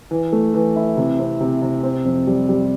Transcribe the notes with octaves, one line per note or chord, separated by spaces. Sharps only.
E3
A3
E3
E4
C3
C4
C3
C3
C4
F2
G3
G3